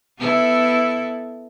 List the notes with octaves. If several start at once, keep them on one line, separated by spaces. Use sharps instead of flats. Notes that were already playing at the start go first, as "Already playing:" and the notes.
B3 E4 A4